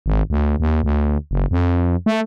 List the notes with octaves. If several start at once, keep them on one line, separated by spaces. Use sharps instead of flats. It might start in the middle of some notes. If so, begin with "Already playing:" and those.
G#1
D2
D#2
D2
F#1
F2
A3